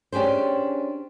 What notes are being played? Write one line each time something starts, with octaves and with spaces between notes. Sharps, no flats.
C#4 D4 G4 G#4 C5